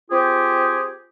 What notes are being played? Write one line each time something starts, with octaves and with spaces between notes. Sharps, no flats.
C4 F4 G4 G#4